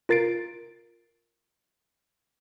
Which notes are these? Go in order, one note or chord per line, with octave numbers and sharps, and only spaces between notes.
F4 A#4 A6 C7 D7